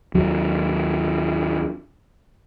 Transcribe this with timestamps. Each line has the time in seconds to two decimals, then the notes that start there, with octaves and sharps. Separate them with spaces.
0.14 D#2 F#3